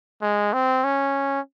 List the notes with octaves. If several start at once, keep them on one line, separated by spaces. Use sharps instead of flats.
G#3
C4
C#4